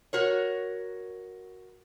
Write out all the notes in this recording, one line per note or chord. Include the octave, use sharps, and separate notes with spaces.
F#4 A#4 C#5